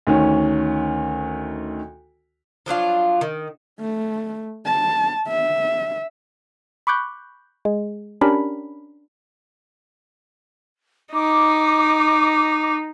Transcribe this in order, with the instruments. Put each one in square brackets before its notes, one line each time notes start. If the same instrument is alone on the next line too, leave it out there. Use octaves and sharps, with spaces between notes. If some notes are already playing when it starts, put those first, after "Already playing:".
[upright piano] D2 D#3 C#4
[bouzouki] F3 F#3 D4 F4
D#3
[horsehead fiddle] A3
A5
E5
[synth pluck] B5 C#6 D6 F#6 G6
G#3
C#4 D4 G4 A#4 B5
[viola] D#4 [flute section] D6